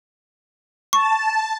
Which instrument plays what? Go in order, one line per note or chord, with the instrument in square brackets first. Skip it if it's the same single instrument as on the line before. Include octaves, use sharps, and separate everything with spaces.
[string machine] A5 [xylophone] C#6